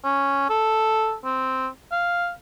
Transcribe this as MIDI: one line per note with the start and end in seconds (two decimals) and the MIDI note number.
0.05 0.49 61
0.50 1.15 69
1.25 1.67 60
1.92 2.31 77